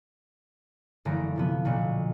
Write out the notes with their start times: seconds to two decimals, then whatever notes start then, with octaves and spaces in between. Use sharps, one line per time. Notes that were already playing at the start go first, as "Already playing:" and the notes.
1.05 F#1 D3 E3 A3 A#5 D7
1.36 C3 F3 B3
1.65 B1 A#2 D3 C#6